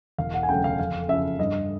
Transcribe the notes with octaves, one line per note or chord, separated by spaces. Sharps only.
E1 F5
F#5
G#5
D2 C#3 F#3 G5
F5
F2 F5
C#3 F3 E5
G2 D#5